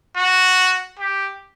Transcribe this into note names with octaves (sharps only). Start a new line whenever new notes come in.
F#4
G4